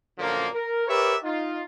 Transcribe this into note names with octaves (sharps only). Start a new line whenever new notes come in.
F#2 A#2 D3 F3 A#3
A#4
G4 A#4 B4 C#5 D5 E5
D#4 F4